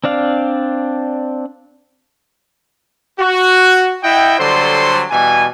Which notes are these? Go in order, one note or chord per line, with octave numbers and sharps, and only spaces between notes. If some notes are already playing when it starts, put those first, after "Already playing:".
C4 D4 D5 F5
F#4
E4 D#5 E5 F#5 G5
D3 F#3 G3 A4 C5 C6
B2 E3 G3 G#5